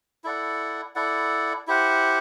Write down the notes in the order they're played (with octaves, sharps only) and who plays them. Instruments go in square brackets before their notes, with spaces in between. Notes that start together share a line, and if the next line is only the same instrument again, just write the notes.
[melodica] E4 A4 D5 F#5
E4 A4 D5 F#5
E4 G4 C5 F#5